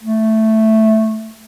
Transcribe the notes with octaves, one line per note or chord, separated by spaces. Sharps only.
A3